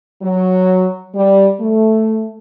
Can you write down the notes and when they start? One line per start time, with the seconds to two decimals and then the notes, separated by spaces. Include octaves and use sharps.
0.22 F#3
1.15 G3
1.61 A3